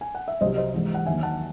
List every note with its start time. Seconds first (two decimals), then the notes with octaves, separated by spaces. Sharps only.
0.01 G#5
0.15 F#5
0.28 E5
0.41 C2 C3 F#3 C5 D#5
0.57 C5 D#5
0.74 G#2 E3
0.94 F#5
1.06 D#2 D#3 F#3 E5 G#5
1.23 F#5 A5